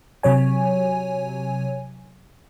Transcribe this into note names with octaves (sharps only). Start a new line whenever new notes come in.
C3 F#3 C#5 G#5